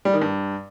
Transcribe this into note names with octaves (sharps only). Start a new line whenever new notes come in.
G3
D#3
G2